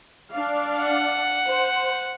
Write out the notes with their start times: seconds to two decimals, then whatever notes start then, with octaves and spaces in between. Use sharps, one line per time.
0.32 D4 D5 F5
0.81 F#5
1.47 C5